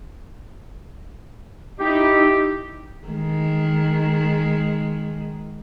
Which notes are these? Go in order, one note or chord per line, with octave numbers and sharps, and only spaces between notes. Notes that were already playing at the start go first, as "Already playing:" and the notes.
D#4 E4 G4
D#3 G#3